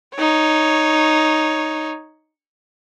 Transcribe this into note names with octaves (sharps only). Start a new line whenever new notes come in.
D#4 C#5